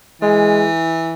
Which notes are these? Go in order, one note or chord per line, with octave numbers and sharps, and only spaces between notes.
E3 G#3